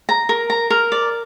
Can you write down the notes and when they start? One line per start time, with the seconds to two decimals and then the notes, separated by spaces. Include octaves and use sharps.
0.09 A#5
0.29 A#4
0.50 A#5
0.70 A#4
0.92 D5